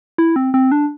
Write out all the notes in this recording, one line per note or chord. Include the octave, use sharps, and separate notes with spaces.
E4
C4
C4
D4